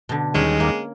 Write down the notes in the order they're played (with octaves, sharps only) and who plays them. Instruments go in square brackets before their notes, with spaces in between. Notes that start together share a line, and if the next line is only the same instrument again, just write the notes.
[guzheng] B2 D3
[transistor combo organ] D#2 D#3 G3 [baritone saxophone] G#3 [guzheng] C#4 G5
[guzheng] A#3